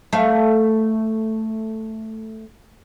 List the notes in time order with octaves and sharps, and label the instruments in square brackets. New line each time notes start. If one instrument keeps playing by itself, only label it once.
[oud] A3 F5